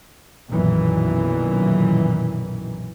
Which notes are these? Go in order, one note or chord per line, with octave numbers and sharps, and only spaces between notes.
B1 F#2 A#2 D#3 E3